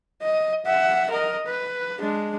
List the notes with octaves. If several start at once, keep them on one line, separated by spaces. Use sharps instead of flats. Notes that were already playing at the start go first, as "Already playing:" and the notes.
D#5
E5 F#5
A#4 D#5
B4
G#3 D4